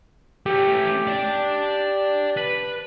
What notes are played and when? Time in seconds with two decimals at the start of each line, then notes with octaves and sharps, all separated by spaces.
0.46 A3 C#4 G4
1.07 D5 A5
2.37 B4